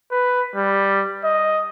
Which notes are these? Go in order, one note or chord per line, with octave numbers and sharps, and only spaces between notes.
B4
G3
D#5